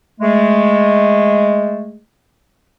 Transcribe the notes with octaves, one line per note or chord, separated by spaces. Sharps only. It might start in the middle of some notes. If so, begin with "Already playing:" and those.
G#3 A3